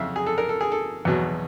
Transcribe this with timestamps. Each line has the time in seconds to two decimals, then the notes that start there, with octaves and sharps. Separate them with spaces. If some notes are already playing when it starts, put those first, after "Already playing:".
Already playing: F2 C#3 F#3 E5 F5
0.16 G#4
0.27 A4
0.38 A#4
0.49 A4
0.61 G#4
0.72 A4
1.05 E2 B2 F#3